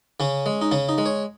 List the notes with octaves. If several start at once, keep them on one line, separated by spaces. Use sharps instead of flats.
C#3 C#4
G#3
D#4
C#3 C#4
D#4
G#3
C#5